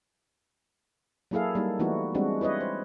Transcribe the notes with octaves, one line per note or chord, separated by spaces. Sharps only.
F#3 A#3 E4 G#4 A4 F5
G3 A#3 D#4
E3 A3 B3 D#4 E4 F#4
G3 G#3 C4 D4 F#4
E4 B4 C#5 D#5
C5